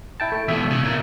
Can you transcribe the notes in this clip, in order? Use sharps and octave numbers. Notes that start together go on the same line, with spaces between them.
E4 G5 A5
A3
B2 E3 E5
C#3
A#2